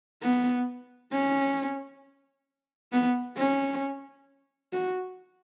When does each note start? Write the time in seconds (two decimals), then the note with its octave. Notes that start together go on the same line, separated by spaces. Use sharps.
0.22 B3
1.12 C#4
2.93 B3
3.38 C#4
4.73 F#4